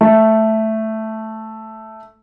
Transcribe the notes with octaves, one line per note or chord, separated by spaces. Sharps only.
A3